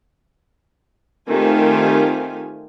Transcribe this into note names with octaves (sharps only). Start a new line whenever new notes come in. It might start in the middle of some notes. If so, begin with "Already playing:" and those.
D#3 A3 C4 F4 G4 G#5